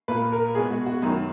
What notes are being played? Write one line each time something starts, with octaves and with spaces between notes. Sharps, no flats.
A#2 A#3 B4
A#4
B2 G#3 B3 G#4
F#4
F#4
F#2 D#3 F#3 D#4